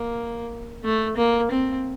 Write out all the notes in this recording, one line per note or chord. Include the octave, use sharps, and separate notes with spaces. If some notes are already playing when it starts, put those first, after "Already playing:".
Already playing: A#3
A3
A#3
C4